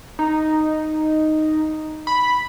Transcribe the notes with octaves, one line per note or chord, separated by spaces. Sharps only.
D#4
B5